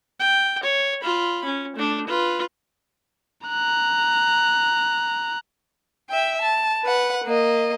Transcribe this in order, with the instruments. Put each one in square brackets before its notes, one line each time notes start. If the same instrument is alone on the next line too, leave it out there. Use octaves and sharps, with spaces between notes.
[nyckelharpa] G5
C#5
F4 B5
C#4
A3 D4
F4 B4
[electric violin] A#5 F#6
[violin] E5 G5
A5
B4 F#5
A#3 D#5